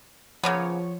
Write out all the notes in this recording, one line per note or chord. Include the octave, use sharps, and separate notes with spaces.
C#3 F3 A#3 B3 C#5